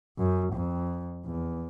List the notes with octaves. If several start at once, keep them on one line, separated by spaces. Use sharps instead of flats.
F#2
F2
E2